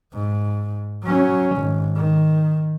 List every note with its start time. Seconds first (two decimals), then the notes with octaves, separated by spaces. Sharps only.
0.14 G#2
1.04 F#3 C#4
1.58 G#1
1.96 D#3